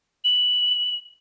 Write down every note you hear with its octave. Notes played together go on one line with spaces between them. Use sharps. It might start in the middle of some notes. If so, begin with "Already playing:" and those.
F#7